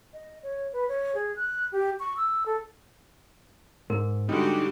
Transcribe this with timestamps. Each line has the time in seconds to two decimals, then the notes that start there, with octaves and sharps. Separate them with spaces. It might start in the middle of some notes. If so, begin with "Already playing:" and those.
0.13 D#5
0.43 C#5
0.73 B4
0.88 C#5
1.15 G#4
1.36 F#6
1.72 G4
1.99 C#6
2.17 E6
2.46 A4
3.90 G#2 A#4
4.29 D3 G3 G#3 D#4 F#4 G4